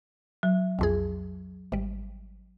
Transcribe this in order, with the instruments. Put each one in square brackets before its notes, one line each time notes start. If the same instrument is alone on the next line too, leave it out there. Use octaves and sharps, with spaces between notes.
[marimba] F#3
[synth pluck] B1 F2 G#4
G#1 G3